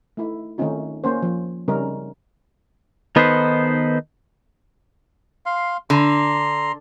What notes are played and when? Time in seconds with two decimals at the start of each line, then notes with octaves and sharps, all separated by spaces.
0.17 A3 D#4 E4
0.58 D#3 A3 C4 C#4 D#4 F4
1.04 A#3 C#4 C5
1.22 F3
1.68 C#3 G3 C4 C#4 D#4 A#4
3.16 D#3 B3 D#4 A4 B4 C5
5.46 F5 C6
5.90 D3 A#5 C6